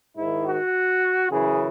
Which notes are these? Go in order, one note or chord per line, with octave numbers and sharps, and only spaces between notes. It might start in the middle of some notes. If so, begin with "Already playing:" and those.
G#2 D#3 E4
F#4
F#2 C#3 E3 G#4